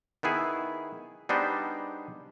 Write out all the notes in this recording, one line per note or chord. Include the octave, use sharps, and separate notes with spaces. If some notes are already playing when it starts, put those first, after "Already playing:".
D#3 B3 E4 G#4
G3 B3 D4 D#4 G#4 C5